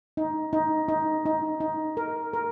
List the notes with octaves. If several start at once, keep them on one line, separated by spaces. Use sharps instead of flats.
D#4
D#4
D#4
D#4
D#4
A#4
A#4